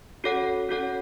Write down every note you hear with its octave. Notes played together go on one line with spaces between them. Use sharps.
C#4 F#4 A4 C#5 F#5
C#4 F#4 A4 C#5 F#5